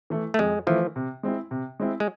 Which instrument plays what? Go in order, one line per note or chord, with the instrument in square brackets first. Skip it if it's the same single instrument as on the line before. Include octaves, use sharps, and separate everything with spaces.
[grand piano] E3 A3 E4
[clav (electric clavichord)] A3
[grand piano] F2 [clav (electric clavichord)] G#3
[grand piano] E3 A3 E4 [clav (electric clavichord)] F3
[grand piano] C3
G#3 C4 E4
C3
G#3 C4 E4
[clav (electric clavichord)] G#3